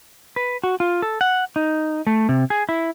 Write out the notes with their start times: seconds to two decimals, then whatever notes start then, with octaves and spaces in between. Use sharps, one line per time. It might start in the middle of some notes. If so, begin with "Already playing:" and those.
0.36 B4
0.64 F#4
0.80 F4
1.02 A4
1.21 F#5
1.56 D#4
2.07 A3
2.29 C3
2.50 G#4
2.69 E4